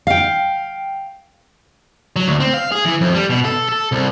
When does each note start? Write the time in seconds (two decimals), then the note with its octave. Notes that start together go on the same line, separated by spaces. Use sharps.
0.07 F5 G5
2.16 F#3
2.28 D2
2.40 C4
2.54 F5
2.72 G#4
2.85 E3
3.01 F2
3.14 G3
3.30 B2
3.45 A4
3.69 A4
3.92 C2